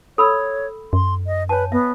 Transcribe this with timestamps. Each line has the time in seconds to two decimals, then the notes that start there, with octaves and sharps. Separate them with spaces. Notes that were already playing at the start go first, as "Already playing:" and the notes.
0.18 A4 C#5 B5 E6
0.93 F#2 C6
1.27 D#5
1.49 B4 C#5 G#5 A5
1.72 B3 E5